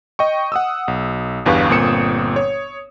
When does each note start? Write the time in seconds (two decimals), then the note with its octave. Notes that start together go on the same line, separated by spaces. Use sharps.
0.19 D#5 G5 C#6
0.52 F#5 D#6 E6
0.88 B1
1.45 G1 E2 G2 B4 F5 C#6
1.69 G1 A#2 C4 D#6 C#7 E7
2.36 C#5